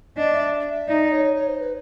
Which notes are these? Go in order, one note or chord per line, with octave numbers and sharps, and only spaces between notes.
D4 D#5
E5
E5
D#4 D5
C#5
C#5
C5
B4